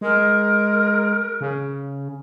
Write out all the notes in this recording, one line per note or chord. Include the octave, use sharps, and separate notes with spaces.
G#3 A#4
C#3